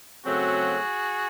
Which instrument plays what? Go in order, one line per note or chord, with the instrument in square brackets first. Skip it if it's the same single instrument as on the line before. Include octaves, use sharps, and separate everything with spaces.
[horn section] C#3 F#3 A3 C4 F#4 G#4